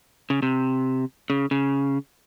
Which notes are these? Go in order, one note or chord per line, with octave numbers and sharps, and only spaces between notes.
C#3
C3
C#3
C#3